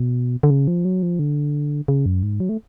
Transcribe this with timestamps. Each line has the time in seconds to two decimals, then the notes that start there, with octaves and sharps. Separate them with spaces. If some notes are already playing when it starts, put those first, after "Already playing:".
Already playing: B2
0.43 D3
0.50 C#3
0.68 F3
0.85 F#3
1.03 F3
1.19 D3
1.88 C#3
2.06 F#2
2.23 G#2
2.40 F#3
2.49 A3